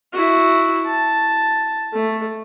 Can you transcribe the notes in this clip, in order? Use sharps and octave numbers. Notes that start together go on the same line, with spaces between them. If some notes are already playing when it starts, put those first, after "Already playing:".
E4 F#4
A5
A3